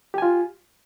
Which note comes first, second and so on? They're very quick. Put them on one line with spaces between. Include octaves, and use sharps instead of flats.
G4 G#5 F4